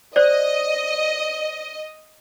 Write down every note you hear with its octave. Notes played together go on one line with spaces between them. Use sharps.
C5 D5 D#5